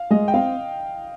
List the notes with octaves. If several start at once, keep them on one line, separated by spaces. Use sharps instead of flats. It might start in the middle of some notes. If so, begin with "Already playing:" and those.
Already playing: F5
G#3 D#5
G5
C4 F5